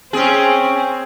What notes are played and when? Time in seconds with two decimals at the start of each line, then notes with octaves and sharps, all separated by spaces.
0.13 C4 C#4 G#4